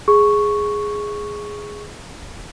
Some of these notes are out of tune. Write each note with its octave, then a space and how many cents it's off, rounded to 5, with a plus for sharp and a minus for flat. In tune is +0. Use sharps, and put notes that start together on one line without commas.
G#4 +0 C#6 +0